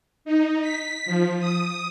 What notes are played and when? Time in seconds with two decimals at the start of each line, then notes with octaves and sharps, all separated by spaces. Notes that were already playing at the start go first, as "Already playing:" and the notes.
0.25 D#4
0.62 B6
1.06 F3
1.39 D#6